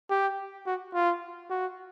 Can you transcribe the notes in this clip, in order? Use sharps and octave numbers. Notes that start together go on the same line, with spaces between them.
G4
F#4
F4
F#4